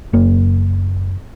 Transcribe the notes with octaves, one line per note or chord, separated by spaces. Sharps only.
F#1 A#3